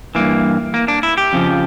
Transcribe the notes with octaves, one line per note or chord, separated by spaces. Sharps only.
G2 E3 A#3
A#3
D4
E4
G4
F2 C#3 F3